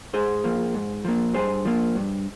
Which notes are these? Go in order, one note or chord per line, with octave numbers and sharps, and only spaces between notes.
G#2 G#4 C5
F3 A#3
G#2
F3 A#3
G2 G#4 C5
F3 A#3
G2